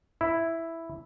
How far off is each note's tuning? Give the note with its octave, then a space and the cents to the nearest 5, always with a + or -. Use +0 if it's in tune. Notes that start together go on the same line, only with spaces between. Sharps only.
E4 +0